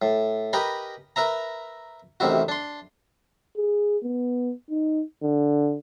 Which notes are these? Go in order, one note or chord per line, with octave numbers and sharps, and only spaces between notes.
A2
G4 A#4 B4 D#5 G#5 B5
A#4 B4 E5 A#5
A1 C3 D#3 E4 F#4
D4 C6
G#4
B3
D#4
D3